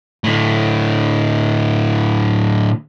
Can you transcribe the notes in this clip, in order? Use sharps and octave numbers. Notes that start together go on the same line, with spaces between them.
A2 D3